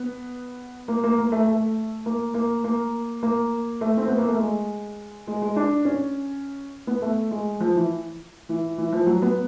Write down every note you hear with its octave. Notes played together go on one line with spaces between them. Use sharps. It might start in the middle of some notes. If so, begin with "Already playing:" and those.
Already playing: B3
A#3
A#3
A#3
A3
A3
A#3
A#3
A#3
A#3
A3
C4
B3
A#3
A3
G#3
G#3
G#3
D4
C#4
B3
A3
G#3
F3
E3
E3
E3
F3
F#3
B3